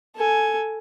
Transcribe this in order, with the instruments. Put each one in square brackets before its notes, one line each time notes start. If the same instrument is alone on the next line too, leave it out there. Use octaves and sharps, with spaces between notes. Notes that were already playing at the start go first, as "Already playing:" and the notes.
[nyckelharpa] A4 G#5